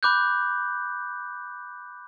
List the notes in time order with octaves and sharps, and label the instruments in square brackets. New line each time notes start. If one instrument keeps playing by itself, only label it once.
[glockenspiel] B5 D6 F#6 G6